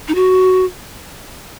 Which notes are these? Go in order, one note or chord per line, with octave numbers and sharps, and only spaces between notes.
D#4
F#4